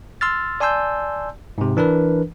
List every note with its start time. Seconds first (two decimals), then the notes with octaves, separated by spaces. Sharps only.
0.21 C6 E6 F6 A6
0.60 D5 G#5 A5 C6 E6 G6
1.58 G#2 C3
1.77 E3 D4 A#4 B4